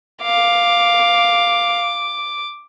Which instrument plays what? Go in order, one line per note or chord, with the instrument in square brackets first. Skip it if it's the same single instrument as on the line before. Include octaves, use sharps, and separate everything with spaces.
[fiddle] F5 [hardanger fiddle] D6